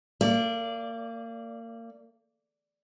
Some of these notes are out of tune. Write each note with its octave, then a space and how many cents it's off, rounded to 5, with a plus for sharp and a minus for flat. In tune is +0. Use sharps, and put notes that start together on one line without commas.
A#3 -30 D5 -5